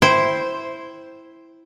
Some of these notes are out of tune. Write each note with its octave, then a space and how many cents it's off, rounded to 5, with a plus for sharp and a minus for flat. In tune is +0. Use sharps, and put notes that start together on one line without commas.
E4 +0 C5 +0 G5 +0